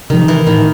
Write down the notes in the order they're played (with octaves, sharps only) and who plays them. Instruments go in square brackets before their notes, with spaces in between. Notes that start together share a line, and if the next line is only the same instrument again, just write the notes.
[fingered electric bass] C3 F3 [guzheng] D#3
[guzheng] E3
[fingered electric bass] A2 [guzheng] D#3